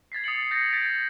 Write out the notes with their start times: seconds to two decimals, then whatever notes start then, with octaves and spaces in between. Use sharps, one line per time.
0.12 G#6 A6 B6 C7
0.24 D#6 A6 C7 C#7 F#7
0.51 G6 A6 A#6 C7 C#7
0.72 G6 A6 B6 D7